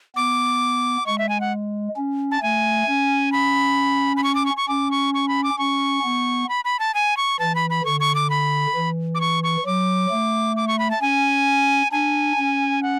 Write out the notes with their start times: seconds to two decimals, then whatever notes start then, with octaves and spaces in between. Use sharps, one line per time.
0.16 B3 D6
1.06 G#3 C#6
1.18 E5
1.29 G#5
1.41 F#5
1.97 C#4
2.31 A5
2.43 A3 G#5
2.87 C#4
3.32 B5
4.17 B5
4.24 C#6
4.35 D6
4.46 C#6
4.57 C#6
4.69 C#4 D6
4.91 C#6
5.14 C#6
5.28 B5
5.44 D6
5.58 C#4 C#6
6.04 B3
6.49 B5
6.65 B5
6.79 A5
6.94 G#5
7.17 C#6
7.39 E3 A5
7.55 B5
7.70 B5
7.85 D3 C#6
8.00 C#6
8.15 D6
8.30 B5
8.75 E3
9.15 D6
9.21 C#6
9.44 C#6
9.66 F#3 D6
10.11 A3
10.57 D6
10.68 C#6
10.79 B5
10.91 A5
11.01 C#4 G#5
11.92 D4 G#5
12.38 C#4
12.83 F#5